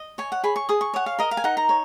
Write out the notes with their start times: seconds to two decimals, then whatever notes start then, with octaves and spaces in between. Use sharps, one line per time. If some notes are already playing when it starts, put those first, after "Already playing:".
Already playing: D#5
0.18 C#5 G#5
0.32 F#5
0.44 G#4 B5
0.56 C#6
0.69 G#4 D#6
0.81 C#6
0.94 C#5 F#5
1.06 F5
1.19 A#4 D#5
1.31 F5
1.37 G#5
1.44 D#4 F#5
1.57 A#5
1.69 C#5